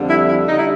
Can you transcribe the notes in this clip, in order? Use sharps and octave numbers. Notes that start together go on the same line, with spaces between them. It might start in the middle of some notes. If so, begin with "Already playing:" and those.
Already playing: F2 D3 G3
E4
E4
D3 G3 D#4
E4